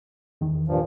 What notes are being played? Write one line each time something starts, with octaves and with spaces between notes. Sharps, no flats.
E2 D#3
G2 A#2 F3